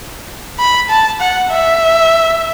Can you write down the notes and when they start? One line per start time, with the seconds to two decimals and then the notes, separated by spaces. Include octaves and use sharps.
0.59 B5
0.89 A5
1.20 F#5
1.51 E5